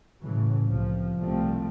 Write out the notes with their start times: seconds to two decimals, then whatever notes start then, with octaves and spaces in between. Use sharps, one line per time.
0.23 A2 C#3 E3 F#3 A3
0.68 C2 C3 F3
1.17 C2 C3 F3 G3 A3 C4